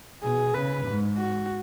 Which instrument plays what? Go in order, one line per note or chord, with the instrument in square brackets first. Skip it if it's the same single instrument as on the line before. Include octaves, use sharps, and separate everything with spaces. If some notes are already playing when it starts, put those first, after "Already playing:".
[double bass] B2 [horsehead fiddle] G#4
[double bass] C#3 [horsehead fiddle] B4
[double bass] G#2
[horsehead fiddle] F#4